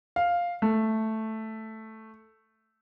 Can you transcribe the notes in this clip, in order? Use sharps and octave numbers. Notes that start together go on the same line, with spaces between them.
F5
A3